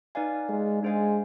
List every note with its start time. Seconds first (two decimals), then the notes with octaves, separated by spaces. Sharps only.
0.15 D#4 B4 D5 F5 G#5
0.49 G#3
0.83 G#3 D4 G#4 C5 F5 G#5